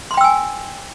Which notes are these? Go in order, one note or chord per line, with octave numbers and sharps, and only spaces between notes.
G5 G#5 B5 C6 E6